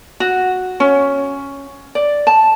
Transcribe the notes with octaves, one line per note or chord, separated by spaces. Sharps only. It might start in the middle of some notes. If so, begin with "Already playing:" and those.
F#4
C#4
D5
A5